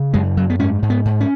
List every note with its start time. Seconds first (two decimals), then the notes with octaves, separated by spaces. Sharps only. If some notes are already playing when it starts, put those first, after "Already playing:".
Already playing: C#3
0.14 F#2 G#3
0.37 F#2 F#3
0.50 B3
0.59 G#2 C#4
0.82 G#2
0.90 B3
1.05 G#2
1.21 C#4